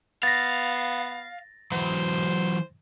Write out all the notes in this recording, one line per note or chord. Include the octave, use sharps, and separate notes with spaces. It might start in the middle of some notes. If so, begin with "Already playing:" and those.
B3 F5 A6 A#6
E3 F#3 C5